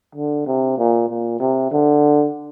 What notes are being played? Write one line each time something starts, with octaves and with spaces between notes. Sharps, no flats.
D3
C3
A#2
A#2
C3
D3